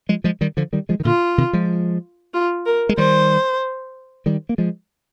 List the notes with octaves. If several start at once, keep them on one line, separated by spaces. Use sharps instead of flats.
F3 G#3
F3 G#3
D#3 G3
D3 F3
D#3 G3
F3 G#3
D#3
A#2 D3 F4
C3 D#3
F3 G#3
F4
A#4
G#3
D#3 G3 C5
D#3 G3
A#3
F3 G#3